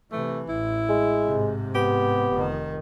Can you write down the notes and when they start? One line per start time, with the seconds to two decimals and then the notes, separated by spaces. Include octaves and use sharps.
0.12 C3 E3 A3
0.49 A1 E4
0.89 G#3
1.25 G#2 C3
1.75 B3 G4
2.32 F1 D#3